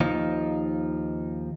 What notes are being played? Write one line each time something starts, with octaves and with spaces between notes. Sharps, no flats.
D#2 F3 D#4